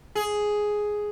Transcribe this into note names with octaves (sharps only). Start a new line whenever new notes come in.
G#4